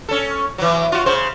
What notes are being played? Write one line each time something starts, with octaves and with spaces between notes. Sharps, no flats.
C#4 A4
E3 F#3
F4 F#4
C#3 C5